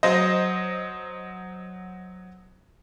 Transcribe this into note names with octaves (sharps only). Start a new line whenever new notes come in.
F#3 C5 D#5